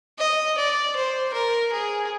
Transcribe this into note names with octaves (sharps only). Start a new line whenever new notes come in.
D#5
D5
C5
A#4
G#4